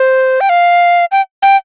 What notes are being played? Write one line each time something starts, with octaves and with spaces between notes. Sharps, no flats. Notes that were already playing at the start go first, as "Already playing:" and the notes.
Already playing: C5
G5
F5
G5
G5